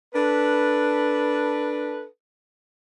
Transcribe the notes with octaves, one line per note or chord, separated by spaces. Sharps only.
D4 A4 B4